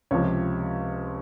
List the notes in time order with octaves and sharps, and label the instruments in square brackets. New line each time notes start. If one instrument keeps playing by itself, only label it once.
[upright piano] C#2 C3 F3 C#5